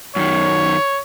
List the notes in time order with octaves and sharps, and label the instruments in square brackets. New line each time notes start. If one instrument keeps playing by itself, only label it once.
[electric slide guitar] F#2 D#3 [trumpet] C#5